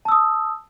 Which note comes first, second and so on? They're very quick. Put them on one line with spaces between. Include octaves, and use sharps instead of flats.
A5 E6 D#6